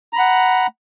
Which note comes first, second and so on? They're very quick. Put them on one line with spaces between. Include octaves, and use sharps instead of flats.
A#5 B5 F#5